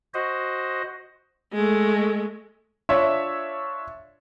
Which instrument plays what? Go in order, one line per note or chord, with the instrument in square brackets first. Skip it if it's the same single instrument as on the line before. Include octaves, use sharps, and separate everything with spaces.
[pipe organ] F#4 C5 D#5
[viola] G#3 A3
[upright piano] D4 F4 C#5 E5